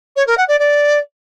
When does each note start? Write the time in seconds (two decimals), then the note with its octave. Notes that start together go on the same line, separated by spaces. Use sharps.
0.16 C#5
0.27 A#4
0.38 F#5
0.48 D5
0.59 D5